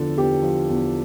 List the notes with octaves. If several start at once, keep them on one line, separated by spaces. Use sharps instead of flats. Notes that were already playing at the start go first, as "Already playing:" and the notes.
Already playing: E2 D3 F3 A4
E2 G4
F3
E2